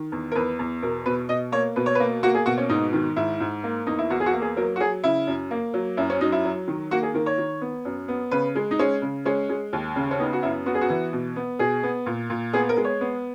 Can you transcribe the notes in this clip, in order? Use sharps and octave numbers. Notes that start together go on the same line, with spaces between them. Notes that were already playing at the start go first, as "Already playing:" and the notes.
Already playing: D#3
E2
A#4
E2 B4
E2
B2 A#4
B2 B4
B2 D#5
A#3 C#5
B2 B4
C#5
B4
A#3
A#3 F#4
G#4
B2 F#4
C#4
G#2 D#4
D#3
G#2 E4
G#2
A#3
E2 D#4
E4
E2 F#4
G#4
F#4
A#3
G#4
F#3 A#4
F#4
F#3 G#4
C#3 E4
F#2
A#3
F#3
F#2 E4
C#4
F#3 D#4
E4
F#3
D#3
A#3 F#4
G#4
D#3 A#4
C#5
D#3
B3
F#2
B3
C#3 B4
G#3
D#4
G#3 C#4
C#3
G#3 C#4
G#3
D#2
C#3
C#4
B3 D#4
F#4
F#2 E4
B3 F#4
G#4
F#4
E3
B2
B3
B2 G#4
B3
A#2
A#2
B3 G#4
A#4
G#3
C#5
B3